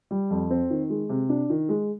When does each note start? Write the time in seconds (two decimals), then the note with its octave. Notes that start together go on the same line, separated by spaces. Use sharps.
0.11 G3
0.30 F2
0.50 C4
0.70 D#3
0.90 G#3
1.10 C3
1.29 D4
1.50 D#3
1.69 G#3